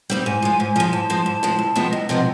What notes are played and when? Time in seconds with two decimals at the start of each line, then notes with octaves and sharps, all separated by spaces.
0.10 G3 C4 D#4
0.26 G#2 G#5
0.42 F3 G#3
0.60 G#2
0.76 F3 G#3
0.92 G#2 A5
1.10 F3 G#3
1.26 G#2 A5
1.43 F3 G#3
1.59 D2
1.76 C3 F3 G#3 B3
1.92 D2 D#5
2.09 C3 F3 G#3 B3